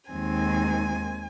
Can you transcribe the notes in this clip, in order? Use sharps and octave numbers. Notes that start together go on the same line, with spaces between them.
D#2 D#3 G#3 C4 G#5